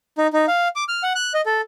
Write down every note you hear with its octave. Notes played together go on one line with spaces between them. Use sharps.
D#4
D#4
F5
D6
F6
F#5
F#6
D#5
A4